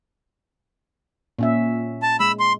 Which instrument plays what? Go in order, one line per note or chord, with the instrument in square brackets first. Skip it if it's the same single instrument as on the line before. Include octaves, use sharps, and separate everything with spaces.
[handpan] A#2 C#4 E5
[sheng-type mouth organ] A5
[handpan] G#3 [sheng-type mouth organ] B5 E6
[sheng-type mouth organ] C6